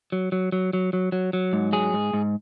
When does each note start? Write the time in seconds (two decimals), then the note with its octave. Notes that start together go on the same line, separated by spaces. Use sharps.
0.12 F#3
0.32 F#3
0.52 F#3
0.73 F#3
0.93 F#3
1.12 F#3
1.33 F#3
1.53 G#2
1.73 F#3 G#4
1.93 G#2
2.13 G#2